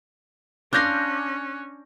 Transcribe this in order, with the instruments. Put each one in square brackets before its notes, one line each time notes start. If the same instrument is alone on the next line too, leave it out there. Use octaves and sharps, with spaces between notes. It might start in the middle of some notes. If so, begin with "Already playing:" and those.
[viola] C#4 [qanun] D4 F5 C6 [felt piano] D6 G6 A#6 [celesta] F#6